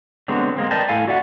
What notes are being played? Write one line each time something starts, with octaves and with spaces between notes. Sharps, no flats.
D3 F#3 G#3 B3 C4
G#3 A#3 C4
A#4 B4 D5 D#5 G5 A5
A2 A4 F5 G#5
F#4 D5 E5 F#5